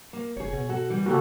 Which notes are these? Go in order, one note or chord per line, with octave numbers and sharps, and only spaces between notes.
A#3
F#1 G#4 C#5
B2
F#4 A4
E3 G3
C#3 E3 A#3 F#4 G4 A4